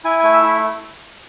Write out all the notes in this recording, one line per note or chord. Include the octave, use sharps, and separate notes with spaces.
E4 G#5
A3 G#5
E5
E4